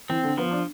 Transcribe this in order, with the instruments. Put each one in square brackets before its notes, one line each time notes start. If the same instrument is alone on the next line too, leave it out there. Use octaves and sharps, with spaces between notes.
[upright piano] E3 [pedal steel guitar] C4
[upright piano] D3
[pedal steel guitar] F3 [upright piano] B3
[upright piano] D4